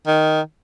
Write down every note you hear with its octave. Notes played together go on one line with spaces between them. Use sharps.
D#3